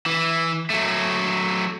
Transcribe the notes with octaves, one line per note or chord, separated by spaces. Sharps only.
E3
F#3 A3